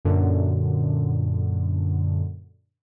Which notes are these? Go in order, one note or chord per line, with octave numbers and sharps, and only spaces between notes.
F#2 A#2 D3